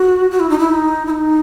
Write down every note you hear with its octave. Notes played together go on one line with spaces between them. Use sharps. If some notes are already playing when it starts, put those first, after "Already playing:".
Already playing: F#4
F#4
E4
D#4
E4
D#4
E4
D#4